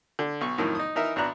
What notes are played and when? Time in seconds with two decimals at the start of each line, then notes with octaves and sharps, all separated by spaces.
0.19 D3
0.41 B1 C#6
0.58 F2 A2 D#3 F#3
0.75 D#4 D#6
0.95 E3 D#4 A#4 E5
1.16 G#1 B3 D4 A#5 F#6